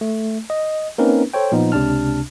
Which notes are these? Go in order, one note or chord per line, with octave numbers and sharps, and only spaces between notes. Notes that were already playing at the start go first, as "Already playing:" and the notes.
A3
D#5
A#3 C4 C#4 D#4 A#4 B4
A4 C5 C#5 G5
A#2 F3 B3 D#4
C#2 C3 D4 A5 F6